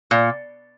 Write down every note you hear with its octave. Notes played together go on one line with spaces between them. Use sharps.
A#2